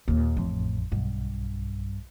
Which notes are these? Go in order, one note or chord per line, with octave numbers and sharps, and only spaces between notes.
D#2 A#2 D#3
A1 F2 A2
B1 G2